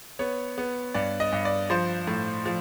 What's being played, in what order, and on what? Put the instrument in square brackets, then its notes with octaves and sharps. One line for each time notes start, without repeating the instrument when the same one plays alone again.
[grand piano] B3 C#5
B3
G2 D5
D#5
G2
D5
F3 C5
A2
F3